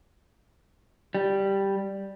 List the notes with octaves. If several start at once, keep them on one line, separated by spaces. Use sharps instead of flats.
G3